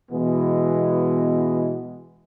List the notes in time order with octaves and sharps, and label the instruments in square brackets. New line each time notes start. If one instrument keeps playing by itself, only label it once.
[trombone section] B2 E3 G#3 B3